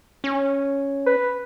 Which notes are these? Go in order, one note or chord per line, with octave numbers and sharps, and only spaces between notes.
C#4
B4